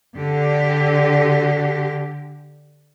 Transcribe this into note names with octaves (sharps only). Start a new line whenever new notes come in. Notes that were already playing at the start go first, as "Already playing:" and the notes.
D3 G4